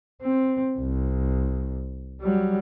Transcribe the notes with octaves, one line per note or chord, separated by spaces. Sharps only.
C4
C2
F#3 G3